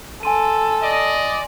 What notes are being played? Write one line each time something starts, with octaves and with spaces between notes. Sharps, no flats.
A4 G#5 C6 D#7
D5 D#5